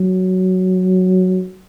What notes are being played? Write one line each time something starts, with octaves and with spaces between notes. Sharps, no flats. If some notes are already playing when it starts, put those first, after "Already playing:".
Already playing: F#3